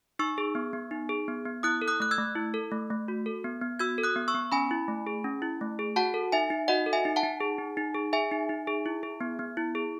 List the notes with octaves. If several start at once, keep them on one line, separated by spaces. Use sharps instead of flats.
D#4 C#6 E6
G#4
B3
B3
D#4
G#4
B3
B3
E4 D#6 F#6
A4
D#6 F#6
A3 F#6
E6 G#6
A3
E4
A4
A3
A3
F#4
A4
B3
B3
F#4 E6 G#6
A4
D#6 F#6
B3
C#6 E6
B3
C#4 G#5 B5
E4
A3
G#4
C#4
E4
A3
G#4
F#4 F#5 A5
A4
D#4 E5 G#5
D#4
F#4 D#5 F#5
A4
E5 G#5
D#4
F#5 A5
D#4
G#4
D#4
D#4
G#4
G#4 E5 G#5
D#4
D#4
G#4
E4
G#4
B3
B3
E4
G#4